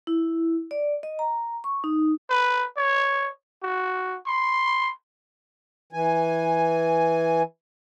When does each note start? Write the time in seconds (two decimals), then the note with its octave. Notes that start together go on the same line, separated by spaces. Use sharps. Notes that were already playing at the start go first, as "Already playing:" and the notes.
0.07 E4
0.71 D5
1.03 D#5
1.19 A#5
1.64 C#6
1.84 D#4
2.29 B4
2.77 C#5
3.63 F#4
4.26 C6
5.93 E3 G#5